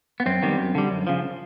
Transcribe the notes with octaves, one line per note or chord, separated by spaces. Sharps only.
B3
F#2 C4
D#3 G3 B3
F#2
D3 G3
F#2
C#3 F3